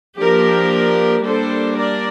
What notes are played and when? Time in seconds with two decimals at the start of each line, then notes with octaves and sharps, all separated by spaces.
0.20 F3 A#3 D4 G4 A#4
1.24 G3 A#3 D4 A4 C5
1.78 A#4 D5